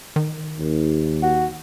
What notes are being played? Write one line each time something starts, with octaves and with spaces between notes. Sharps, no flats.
D#3
D#2
F#4